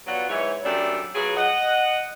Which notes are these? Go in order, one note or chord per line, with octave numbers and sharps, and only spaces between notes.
F#3 G3 B3 F4 F#5
G#2 E3 C#5
F#2 G3 A3 D4 G4
F#3 B3 F4 G#4
D#5 F#5